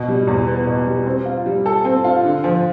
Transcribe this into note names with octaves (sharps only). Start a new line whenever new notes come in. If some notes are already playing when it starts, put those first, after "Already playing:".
Already playing: B2
G3
E2
B3
B2
G3
C4
F4
G3
A4
C4
F4
D3
F3